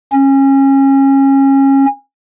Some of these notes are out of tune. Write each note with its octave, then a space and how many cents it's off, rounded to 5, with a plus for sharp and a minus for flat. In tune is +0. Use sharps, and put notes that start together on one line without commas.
C#4 -25